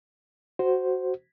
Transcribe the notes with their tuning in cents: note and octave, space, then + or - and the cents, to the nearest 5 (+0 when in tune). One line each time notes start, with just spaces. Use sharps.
F#4 +10 C5 +0